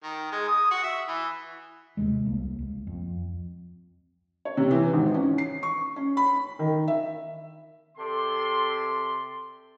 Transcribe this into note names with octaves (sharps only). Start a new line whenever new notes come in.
D#3
G#3
D#6
F#4
E5
E3
D#2 C3 G#3
C2 A#3
C#2
F2
C#5
C3
E3
G#1
C#4
C7
C#6
C#4
B5
D#3
E5
C3 A4 D5 C6